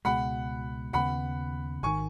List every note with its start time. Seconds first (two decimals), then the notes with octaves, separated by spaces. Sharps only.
0.05 C#2 B2 G#3 F#5 B5
0.93 D#2 C#3 B3 F#5 B5
1.83 G#1 D#3 G#5 C#6